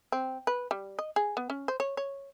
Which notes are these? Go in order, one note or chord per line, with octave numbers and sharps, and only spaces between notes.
C4
B4
G3
D#5
G#4
B3
C#4
C5
C#5
C#5